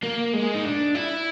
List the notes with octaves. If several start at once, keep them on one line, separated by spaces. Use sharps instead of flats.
A#3
G#3
D#4
D4
E4